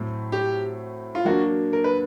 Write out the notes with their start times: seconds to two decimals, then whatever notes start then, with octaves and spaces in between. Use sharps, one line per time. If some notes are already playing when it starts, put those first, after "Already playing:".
Already playing: A2 F#3 A3 C4
0.32 G4
1.15 F4
1.25 F#3 A#3 D4 F#4
1.73 A#4
1.84 B4